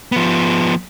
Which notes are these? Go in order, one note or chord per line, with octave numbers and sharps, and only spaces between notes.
F3 B3